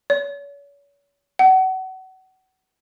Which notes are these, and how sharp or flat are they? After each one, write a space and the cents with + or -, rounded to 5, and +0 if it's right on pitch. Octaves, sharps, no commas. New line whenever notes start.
C#5 +40
F#5 +30